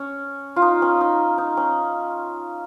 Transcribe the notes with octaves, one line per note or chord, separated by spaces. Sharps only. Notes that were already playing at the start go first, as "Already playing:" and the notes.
Already playing: C#4
F4
D#4
C#4
D#4
D#4
C#4